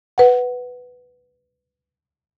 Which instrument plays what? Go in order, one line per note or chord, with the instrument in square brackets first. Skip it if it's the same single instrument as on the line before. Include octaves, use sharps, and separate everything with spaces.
[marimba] B4 F#5